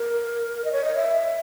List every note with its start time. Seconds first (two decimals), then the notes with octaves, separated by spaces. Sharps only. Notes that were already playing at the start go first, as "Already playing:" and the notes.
Already playing: A#4
0.65 D#5
0.72 C#5
0.84 D#5
0.95 E5